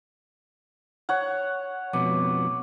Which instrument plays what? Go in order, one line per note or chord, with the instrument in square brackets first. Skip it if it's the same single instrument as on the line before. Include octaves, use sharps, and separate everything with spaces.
[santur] C#5 F#5
[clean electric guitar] F2 B2 B3 [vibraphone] D6